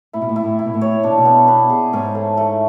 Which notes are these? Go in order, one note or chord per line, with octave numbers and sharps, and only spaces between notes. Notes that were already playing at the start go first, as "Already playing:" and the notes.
A2 E4
B2
A2
E4
A2
E4
B2
A2
C#5
B2 D4
C#3
B2
B3
B3
G#4
G#2 C#4
A3
A3